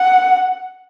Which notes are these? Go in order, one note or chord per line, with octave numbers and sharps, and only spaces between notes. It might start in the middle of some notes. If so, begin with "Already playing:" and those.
Already playing: F#5